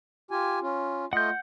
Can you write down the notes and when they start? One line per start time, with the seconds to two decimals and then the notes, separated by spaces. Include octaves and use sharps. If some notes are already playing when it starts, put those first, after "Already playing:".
0.31 F4 G4 G#5
0.62 C#4 F4
1.13 A3 F4 D#5 F#5 G6